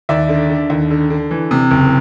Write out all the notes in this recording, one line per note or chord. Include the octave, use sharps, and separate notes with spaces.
D#2 D5 E5
D3
D3
D#2
D3
D3
E3
C3
F#1